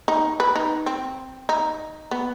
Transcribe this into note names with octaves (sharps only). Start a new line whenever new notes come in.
D#4
B4
D#4
C4
D#4
B3